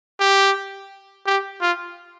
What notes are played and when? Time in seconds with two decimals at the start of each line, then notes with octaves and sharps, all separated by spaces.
0.20 G4
1.27 G4
1.61 F4